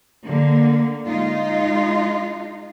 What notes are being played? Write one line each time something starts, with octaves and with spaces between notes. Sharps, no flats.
D3 A#3
G#3 D#4 F4